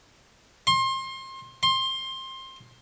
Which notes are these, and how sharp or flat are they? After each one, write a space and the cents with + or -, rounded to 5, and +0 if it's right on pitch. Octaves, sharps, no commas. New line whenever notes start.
C6 +30
C6 +20